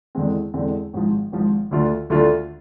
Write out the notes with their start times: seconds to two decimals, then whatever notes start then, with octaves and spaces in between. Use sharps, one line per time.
0.15 E2 D3 G#3 C4
0.54 E2 D3 G#3 C4
0.93 G#1 G#2 F3
1.32 G#1 G#2 F3
1.71 D2 D3 A3 D4 F4
2.10 D2 D3 A3 D4 F4